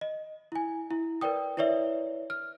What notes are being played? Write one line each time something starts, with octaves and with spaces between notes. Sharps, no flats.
D#5
E4 G#5
E4
A#4 B4 D5 G5 D#6
E4 B4 C#5 D5 E5
F6